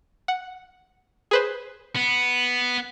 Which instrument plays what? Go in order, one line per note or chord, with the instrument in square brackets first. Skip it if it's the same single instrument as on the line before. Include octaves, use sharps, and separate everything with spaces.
[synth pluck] F#5
G#4 B4 C5
[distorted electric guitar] B3